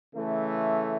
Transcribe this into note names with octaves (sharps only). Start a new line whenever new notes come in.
C#3 E3 A3